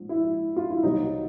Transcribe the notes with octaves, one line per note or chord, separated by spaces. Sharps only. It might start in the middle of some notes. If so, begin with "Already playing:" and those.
Already playing: A#1 G#2 F3
E4
F4
E4
C2 C3 D#3 F#3 A#3 D#4